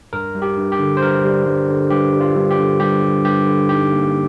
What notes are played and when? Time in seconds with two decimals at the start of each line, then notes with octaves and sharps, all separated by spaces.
0.13 G2 A#4
0.35 G3
0.42 G4
0.57 G2
0.72 G4
0.79 D3
0.97 C5
1.02 G2 A#4
1.24 G3
1.46 G2
1.69 D3
1.90 G2 G4
2.14 G3
2.21 F4
2.36 G2
2.51 G4
2.58 D3
2.80 G2 G4
3.02 G3
3.24 G2 G4
3.47 D3
3.69 D#4 G4
3.92 A#3